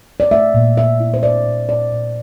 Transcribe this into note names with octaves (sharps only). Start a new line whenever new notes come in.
D5
A3 E5
A#2
E4 E5
E4
C5
E4 D5
A#2
A#2 D5
A#2